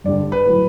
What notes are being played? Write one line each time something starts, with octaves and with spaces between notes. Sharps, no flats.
G2 D3 G3 D5
B4
A2 F#3